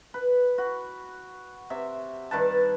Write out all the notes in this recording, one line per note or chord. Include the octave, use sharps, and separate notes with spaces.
B4
F#4
C3 E5
G2 D#3 B4 A5